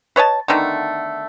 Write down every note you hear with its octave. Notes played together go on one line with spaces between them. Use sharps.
B4 C#5 D#5 A5
D3 D#3 A3 B3